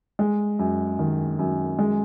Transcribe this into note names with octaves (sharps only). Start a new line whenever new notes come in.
G#3
F#2
D#3
F#2
G#3